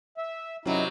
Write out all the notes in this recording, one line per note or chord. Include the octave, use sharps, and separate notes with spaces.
E5
F#2 C3 F#3 D#4 E4